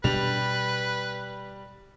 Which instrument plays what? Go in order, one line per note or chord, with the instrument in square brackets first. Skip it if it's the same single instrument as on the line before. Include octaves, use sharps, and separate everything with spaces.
[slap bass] B2 D4 [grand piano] G3 F7 [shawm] B4